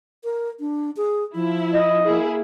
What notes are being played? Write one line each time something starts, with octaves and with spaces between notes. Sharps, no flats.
A#4
D4
G#4
F3 E4
D#5
A#3 E4 G#4